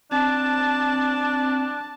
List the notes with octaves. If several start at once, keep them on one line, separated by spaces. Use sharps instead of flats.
C4 D4 A5